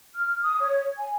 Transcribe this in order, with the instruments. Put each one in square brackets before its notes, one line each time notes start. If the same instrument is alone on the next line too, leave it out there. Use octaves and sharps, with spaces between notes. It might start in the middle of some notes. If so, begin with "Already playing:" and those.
[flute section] F6
D#6
C#5
G#5